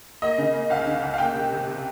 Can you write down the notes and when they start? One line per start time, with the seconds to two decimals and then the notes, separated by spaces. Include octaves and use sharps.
0.22 A#3 D#5
0.38 C#3
0.54 A#3
0.70 C#2 F5
0.86 C#3
1.02 C#2
1.14 F5
1.18 A#3 G5
1.35 C3
1.51 C3
1.67 C3